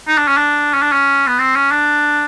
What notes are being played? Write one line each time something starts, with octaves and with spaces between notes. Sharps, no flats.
D#4
D4
C#4
D4
C#4
D4
C#4
B3
C4
C#4
D4